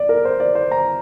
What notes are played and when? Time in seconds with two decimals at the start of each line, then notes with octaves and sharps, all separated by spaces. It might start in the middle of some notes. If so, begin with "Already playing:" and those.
Already playing: D5
0.09 A#4
0.25 C5
0.40 D5
0.55 C5
0.71 A#5